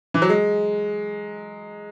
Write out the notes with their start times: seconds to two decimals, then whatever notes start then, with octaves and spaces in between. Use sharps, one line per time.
0.14 E3
0.22 F#3
0.29 G#3